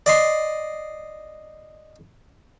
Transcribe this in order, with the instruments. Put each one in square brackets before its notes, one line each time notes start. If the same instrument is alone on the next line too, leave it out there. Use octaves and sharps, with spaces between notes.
[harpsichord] D5 D#5 C6